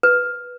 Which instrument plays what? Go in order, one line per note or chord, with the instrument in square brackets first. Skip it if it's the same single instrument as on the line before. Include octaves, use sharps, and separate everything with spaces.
[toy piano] B4